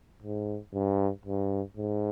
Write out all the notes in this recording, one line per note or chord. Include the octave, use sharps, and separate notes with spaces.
G#2
G2
G2
G#2